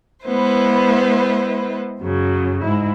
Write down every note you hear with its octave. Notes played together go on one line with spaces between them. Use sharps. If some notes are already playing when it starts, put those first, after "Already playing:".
G#3 B3 E4 B4 C5
F#2 C#3 F#3
G#2 E4